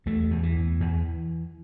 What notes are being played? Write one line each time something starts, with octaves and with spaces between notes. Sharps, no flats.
E2 A3
E2
E3
E2
E2